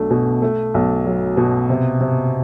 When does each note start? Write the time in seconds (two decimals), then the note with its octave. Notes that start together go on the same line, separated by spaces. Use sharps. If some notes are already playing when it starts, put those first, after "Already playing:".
Already playing: B1 A3 D4
0.10 B2
0.42 A3
0.74 B1
1.06 F#3
1.37 B2
1.70 C3
2.00 C3